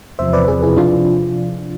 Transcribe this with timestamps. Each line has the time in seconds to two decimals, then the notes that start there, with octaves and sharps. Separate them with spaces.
0.19 E2 C3 F3 C5 E5
0.33 B4 D5
0.48 E2 C3 F3 G#4 B4
0.62 E4 G#4
0.77 C3 F3 D4 F4